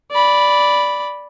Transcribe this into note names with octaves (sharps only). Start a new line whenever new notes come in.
D5 B5